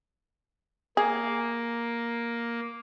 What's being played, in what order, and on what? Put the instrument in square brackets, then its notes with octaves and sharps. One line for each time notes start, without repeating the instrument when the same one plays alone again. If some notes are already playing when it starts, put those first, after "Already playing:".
[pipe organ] A#3 [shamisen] G#4